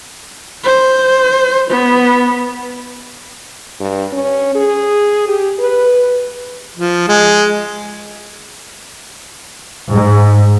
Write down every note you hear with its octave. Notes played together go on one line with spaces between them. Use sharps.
C5
B3
G2
C#4
G#4
G4
B4
F3
G#3
G#2